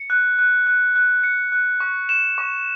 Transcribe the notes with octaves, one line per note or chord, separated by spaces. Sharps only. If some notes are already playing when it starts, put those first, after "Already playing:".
Already playing: C#7
F#6
F#6
F#6
F#6
C#7
F#6
C#6
E7
C#6